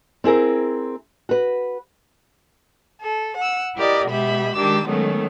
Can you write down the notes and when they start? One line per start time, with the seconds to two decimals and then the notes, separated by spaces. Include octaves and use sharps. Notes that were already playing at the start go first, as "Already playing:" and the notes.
0.24 C4 E4 G#4 A#4
1.29 F#4 B4
3.00 A4
3.37 F#5 E6
3.75 E4 G4 A#4 D5 D#5
4.07 B2 G#3 G4 E5 B5
4.55 D#3 G#3 D4 G4 D6 E6
4.86 D#3 F#3 G#3 A3 B3 C#4